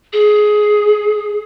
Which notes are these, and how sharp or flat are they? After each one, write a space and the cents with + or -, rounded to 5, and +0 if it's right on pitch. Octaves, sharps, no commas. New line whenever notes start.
G#4 +15